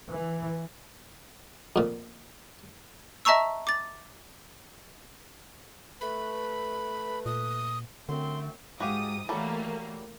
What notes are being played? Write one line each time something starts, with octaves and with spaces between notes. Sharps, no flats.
E3
F2 A#2
D#5 E5 A5 A#5 C#6 E6
D6 A6
A3 B4 B5
A#2 D#6
F#2 D3 A3 C4 C6
G#2 F#4 G4 F5 D#6
E3 F#3 G3 A3 A#3 A4